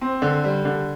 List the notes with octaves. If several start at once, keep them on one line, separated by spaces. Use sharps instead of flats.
C4
D3
G3
D3